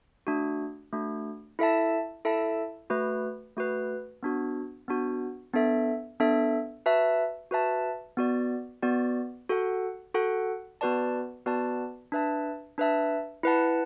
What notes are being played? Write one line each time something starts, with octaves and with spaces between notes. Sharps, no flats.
A3 D4 F#4
A3 D4 F#4
E4 A4 E5 A5
E4 A4 E5 A5
A3 F#4 B4
A3 F#4 B4
B3 D4 F#4
B3 D4 F#4
B3 D4 A4 E5
B3 D4 A4 E5
F#4 B4 E5 A5
F#4 B4 E5 A5
B3 F#4 D5
B3 F#4 D5
F#4 A4 F#5
F#4 A4 F#5
B3 F#4 B4 D5 A5
B3 F#4 B4 D5 A5
D4 B4 E5 A5
D4 B4 E5 A5
E4 B4 F#5 A5